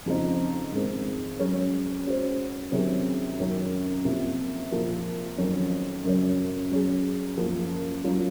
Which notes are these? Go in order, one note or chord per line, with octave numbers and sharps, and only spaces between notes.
F2 C#3 F3 C4 D#4
G#2 D#3 G#3 C4
F#3 C#4 G#4 C#5
G#3 C#4 F#4 C5
C3 D#3 F#3 C#4 G#4
F#2 D#3 F#3 C#4
F2 C3 F3 A#3
A#2 F3 A#3
F2 D#3 F#3 C#4
F#2 C#3 F#3 C#4
F#3 C#4 G#4
F#2 F3 A#3
F#3 C#4 F4